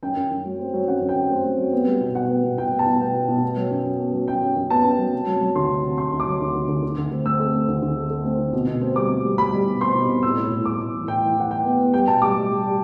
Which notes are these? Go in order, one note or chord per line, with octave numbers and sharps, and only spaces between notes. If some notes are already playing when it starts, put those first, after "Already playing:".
F#2 G5
F#2
F#2
F#3
C4
F#3
F#2 F#5
F#2
G5
F#2
C4
C4
F#3
B3
G3
B2
B2 F#5
B3
B2
B2 G5
B3
A5
B2
B3 G5
B2
B2
B3
F#3
F#2
F#2
B3
F#3
F#2 G5
F#2
F#2
B3 A5
F#2
F#3
C3
F#3
F#3
D2 C6
C3
C3
C3 C6
D2
D6
F#3
D2
D2
D2
D3
D2
C4
C4 E6
A3
C4
D2
D2
A3
A3
C4
D3
B2
B2
C4
G3 D6
C4
G3
G3 B5
G3
B2
C4 C6
B2
B2
A2 E6
A2
A2
A2 D6
A2
E3
A2 G5
E3
E3 F#5
E3 G5
B3
B3
G3 G5
B2 A5
G3 D6
G3
G3
G3